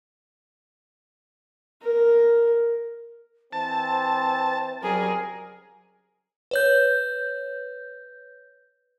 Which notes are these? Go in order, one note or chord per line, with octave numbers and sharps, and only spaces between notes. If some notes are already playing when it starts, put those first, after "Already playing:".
A#4
E3 C4 C5 A5
C#3 F#3 G3 C4 G#4 A#4
B4 C#5 G6